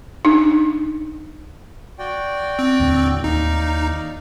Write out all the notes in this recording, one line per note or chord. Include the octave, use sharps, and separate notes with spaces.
D4 D#4
F#4 D5 G5
C4
D#2 A2 D3
D#2 D#4 D5 D#5 F5